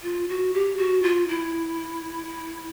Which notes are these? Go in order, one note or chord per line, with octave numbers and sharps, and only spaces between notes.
F4
F#4
G4
F#4
F4
E4